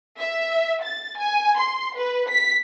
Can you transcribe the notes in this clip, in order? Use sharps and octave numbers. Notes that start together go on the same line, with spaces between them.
E5
A6
G#5
C6
B4
B6